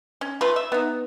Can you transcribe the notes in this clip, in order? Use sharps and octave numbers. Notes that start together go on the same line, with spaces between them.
C#4
A3 F4 B4
E5
B3 D#4